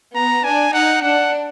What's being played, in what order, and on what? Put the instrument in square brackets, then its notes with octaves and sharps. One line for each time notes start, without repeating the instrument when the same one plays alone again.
[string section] B3 [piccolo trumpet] A#5
[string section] D4 [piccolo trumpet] G#5
[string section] D#4 [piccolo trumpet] F#5
[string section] D4 [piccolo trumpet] F#5